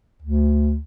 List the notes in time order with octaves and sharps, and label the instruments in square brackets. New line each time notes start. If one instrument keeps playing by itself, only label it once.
[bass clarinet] D2